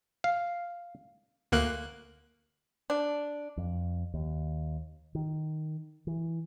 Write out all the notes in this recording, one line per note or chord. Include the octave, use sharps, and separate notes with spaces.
F5
D2 A#3 F#6
D4
F2
D#2
D#3
E3